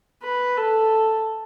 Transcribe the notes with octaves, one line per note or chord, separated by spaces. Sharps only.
B4
A4